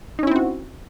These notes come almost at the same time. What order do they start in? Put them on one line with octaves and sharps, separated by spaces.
D#4 C#4 E4 C4 F#4